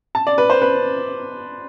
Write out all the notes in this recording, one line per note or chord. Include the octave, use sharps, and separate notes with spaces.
A5
D5
B4
C5
B4